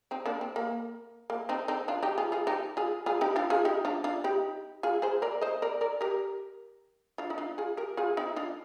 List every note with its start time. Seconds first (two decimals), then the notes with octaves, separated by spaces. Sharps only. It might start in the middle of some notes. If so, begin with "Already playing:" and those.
0.11 C4 D#4
0.26 A#3 D4
0.41 C4
0.56 A#3
1.30 A#3
1.49 C4 D#4
1.68 C4 D#4
1.88 D4 F4
2.03 D#4 G4
2.18 F4 G#4
2.32 F4 G#4
2.47 D#4 G4
2.77 F4 G#4
3.06 F4 G#4
3.21 D#4 G4
3.36 D4 F4
3.50 F4 G#4
3.65 D#4 G4
3.85 D4 F4
4.04 D4 F4
4.24 D#4 G4
4.83 F4 G#4
5.02 G#4 C5
5.22 A#4 D5
5.41 C5 D#5
5.62 A#4 D5
5.81 A#4 D5
6.01 G4 A#4
7.18 D4 F4
7.30 D#4
7.38 D4 F4
7.58 F4 G#4
7.77 G4 A#4
7.97 F4 G#4
8.17 C4 D#4
8.36 D4 F4